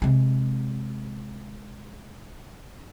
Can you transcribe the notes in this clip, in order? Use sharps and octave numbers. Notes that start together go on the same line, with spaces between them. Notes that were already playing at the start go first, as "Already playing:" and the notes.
C3 G#3